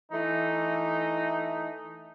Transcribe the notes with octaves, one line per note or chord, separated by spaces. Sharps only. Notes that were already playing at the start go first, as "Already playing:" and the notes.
E3 A3 D#4